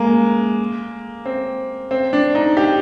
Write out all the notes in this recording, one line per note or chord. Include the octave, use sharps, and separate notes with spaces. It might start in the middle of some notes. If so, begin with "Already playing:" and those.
Already playing: G#3 A#3
C4
C4
D4
D#4
G4